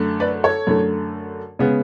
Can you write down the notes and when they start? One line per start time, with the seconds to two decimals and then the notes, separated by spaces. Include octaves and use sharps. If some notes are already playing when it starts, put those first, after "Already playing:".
Already playing: F#2 D3 A3
0.20 B4 D5
0.44 A4 C#5
0.67 F#2 D3 A3
1.59 C#3 G#3 B3